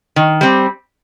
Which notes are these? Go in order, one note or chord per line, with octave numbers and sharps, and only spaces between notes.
D#3
G3 C4